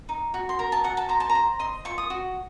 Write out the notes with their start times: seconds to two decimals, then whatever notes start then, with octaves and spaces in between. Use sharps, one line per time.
0.09 D#4
0.34 F#4
0.49 C6
0.59 A#4 A#5
0.72 A5
0.84 F#4 F#5
0.97 A5
1.09 C5 A#5
1.20 A5
1.30 A#5
1.35 C5
1.60 D#5 C6
1.85 F4 C#6
1.98 D#6
2.10 F#4